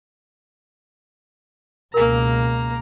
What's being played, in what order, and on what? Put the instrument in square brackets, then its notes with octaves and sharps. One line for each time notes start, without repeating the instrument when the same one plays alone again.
[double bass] C#2 B2 [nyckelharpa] A#3 A#5 [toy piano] A#4 G#5